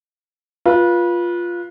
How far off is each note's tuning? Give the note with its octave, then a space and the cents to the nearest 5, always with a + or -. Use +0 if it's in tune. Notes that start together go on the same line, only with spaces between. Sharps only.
F4 +0 B4 -25